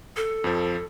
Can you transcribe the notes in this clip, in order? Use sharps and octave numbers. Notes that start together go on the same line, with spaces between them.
A4
F2 F3